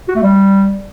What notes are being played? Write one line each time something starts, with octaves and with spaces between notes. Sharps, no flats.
F#4
A3
G3